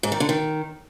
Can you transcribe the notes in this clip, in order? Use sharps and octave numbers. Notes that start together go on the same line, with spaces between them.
G#2
D#3
D3
D#3